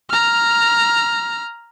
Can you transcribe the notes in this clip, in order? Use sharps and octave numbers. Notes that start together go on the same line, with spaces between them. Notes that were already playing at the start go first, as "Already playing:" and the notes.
A#5 F6